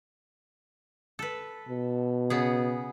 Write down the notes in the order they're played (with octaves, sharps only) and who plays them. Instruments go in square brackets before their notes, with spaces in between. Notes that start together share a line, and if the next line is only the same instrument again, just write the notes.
[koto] A4 B4
[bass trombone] B2
[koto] C#3 B3 G#4